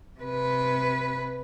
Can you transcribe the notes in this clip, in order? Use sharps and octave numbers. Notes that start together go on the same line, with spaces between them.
C3 B4